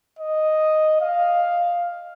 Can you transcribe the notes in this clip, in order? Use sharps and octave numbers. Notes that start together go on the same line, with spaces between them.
D#5
F5